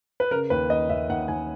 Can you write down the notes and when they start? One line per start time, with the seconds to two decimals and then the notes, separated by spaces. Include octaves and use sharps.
0.20 B4
0.31 C#3 A#4
0.50 D#2 B4
0.70 D#2 D#5
0.89 D#2 E5
1.09 D#2 F#5
1.28 D#2 G#5